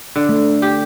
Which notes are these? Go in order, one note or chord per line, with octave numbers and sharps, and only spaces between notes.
D3
A3
G4